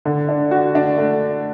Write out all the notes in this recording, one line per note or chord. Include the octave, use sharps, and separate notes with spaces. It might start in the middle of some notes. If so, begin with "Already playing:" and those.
D3
D4
F#4
D4
A3